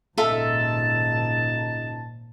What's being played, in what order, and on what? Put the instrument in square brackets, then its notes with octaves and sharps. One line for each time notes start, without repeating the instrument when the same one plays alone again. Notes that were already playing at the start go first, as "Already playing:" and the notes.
[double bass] G#1 A#2 [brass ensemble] C#2 D#4 A5 [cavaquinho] F4 A4 E5